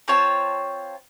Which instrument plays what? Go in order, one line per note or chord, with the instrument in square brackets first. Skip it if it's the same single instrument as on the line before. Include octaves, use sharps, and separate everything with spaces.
[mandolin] C4 F4 C#5 A5